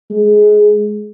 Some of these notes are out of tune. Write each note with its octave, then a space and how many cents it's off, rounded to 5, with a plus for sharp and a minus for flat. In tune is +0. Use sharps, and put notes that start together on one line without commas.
G#3 +15